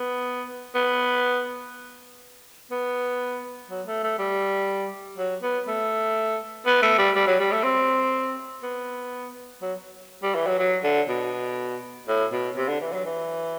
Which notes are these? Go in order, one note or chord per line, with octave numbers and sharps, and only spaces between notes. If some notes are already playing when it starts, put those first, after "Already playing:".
Already playing: B3
B3
B3
F#3
A3
A3
G3
F#3
B3
A3
B3
A3
G3
G3
F#3
G3
A3
C4
B3
F#3
G3
E3
F#3
F#3
D3
B2
A2
B2
C3
D3
E3
F#3
E3